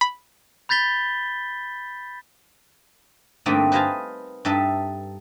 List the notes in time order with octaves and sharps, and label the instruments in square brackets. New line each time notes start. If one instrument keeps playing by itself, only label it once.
[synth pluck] B5
[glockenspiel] B5 G6 A6 B6 G7
[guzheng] G2 D3 A3 A#3 C4 D#4
B4 C5 D#5 F5 G#5 A5
G2 D#4 A4 E5